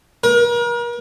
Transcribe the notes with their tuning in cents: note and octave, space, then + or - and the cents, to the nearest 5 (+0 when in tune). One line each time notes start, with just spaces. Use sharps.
A#4 +40